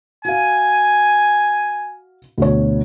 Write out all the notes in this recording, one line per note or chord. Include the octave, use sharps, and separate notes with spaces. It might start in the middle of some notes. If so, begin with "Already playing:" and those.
F#4 F5 G#5
D2 B2 C#5